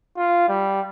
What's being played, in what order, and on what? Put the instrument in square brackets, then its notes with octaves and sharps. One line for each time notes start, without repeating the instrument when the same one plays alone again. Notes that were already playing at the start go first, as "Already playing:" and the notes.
[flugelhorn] F4
G3